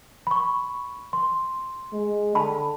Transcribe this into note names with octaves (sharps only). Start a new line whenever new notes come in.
B5 C#6
C6
G#3
D3 A5 B5